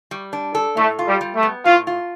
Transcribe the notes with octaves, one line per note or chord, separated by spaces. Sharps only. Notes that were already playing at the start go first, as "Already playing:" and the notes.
G3
D4
A4
A2 A3
F4
G3
G3
A3
B3
A2 F4
F4